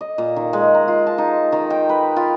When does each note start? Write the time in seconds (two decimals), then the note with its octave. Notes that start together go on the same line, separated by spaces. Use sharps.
0.01 D#5
0.18 A#2
0.36 D#3
0.53 G#3
0.75 A#5
0.88 F4
1.07 A5
1.18 D#4
1.52 D#3
1.70 G5
1.89 B4
2.16 F4